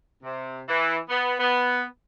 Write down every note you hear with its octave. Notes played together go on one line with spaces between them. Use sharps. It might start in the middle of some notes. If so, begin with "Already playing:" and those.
C3
E3
B3
B3